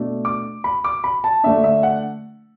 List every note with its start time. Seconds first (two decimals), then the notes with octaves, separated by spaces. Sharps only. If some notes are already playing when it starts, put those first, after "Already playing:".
Already playing: B2 A3 D4
0.25 D6
0.64 B5
0.84 D6
1.04 B5
1.24 A5
1.44 D3 A3 D4 E5
1.64 E5
1.83 F#5